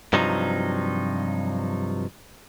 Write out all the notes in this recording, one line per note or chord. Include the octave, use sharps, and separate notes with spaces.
G2 C3 F3 F#3 D#4